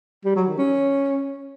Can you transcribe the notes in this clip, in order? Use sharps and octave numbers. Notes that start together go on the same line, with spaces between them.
G3
F#3
D#3
C#4